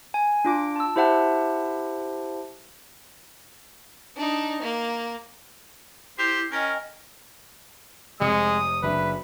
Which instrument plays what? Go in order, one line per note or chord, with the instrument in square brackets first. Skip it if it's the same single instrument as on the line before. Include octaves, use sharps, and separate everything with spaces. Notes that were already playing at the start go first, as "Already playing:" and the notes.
[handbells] G#5
D4 F4 D6 D7
A5 E6
E4 G4 C5 E5 F#5 A5
[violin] D4 D#4
A#3
[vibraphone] E4 [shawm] G4 [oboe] C5
[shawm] C#4 [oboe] A#4 [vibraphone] D#5 G5 G#5
[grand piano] F1 C3 C#7 [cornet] G#3 [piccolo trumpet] D#6
[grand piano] F#1 D4 E5 [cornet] B4